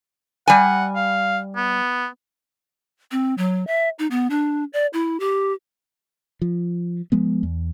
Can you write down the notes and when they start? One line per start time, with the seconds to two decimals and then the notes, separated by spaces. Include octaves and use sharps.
0.48 G3 F#5 G#5
0.95 F5
1.56 B3
3.12 C4
3.38 F#3
3.67 E5
3.99 D#4
4.11 B3
4.30 D4
4.73 D5
4.93 E4
5.20 G4
6.42 F3
7.12 F3 G#3 B3
7.43 E2